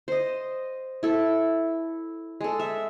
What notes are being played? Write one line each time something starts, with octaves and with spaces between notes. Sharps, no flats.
C5 D#5
E4 A4
G#3 A4
E5